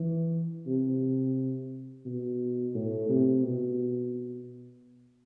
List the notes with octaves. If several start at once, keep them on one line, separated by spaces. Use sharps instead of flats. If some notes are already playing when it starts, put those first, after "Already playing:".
Already playing: E3
C3
B2
A2
C3
B2